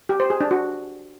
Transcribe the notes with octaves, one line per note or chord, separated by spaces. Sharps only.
G4
C5
G#4
D4
F#4